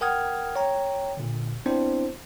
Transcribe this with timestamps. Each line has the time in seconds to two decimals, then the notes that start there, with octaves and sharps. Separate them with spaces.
0.01 A#4 F#5 G5 D#6 F6 G#6
0.56 C#5 G5 A#5
1.17 A#2 D3
1.66 B3 C4 D4 E4 C5